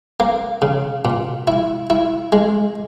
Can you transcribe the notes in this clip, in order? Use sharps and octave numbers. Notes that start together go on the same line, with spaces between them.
A#3
C#3
A#2
E4
E4
G#3